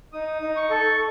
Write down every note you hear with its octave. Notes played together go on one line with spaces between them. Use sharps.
D#4 D#6
D#4
C#6
A4